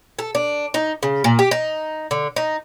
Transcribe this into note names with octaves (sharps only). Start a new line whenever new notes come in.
A4
D4
D#4
C#3
A#2
G4
D#4
D3
D#4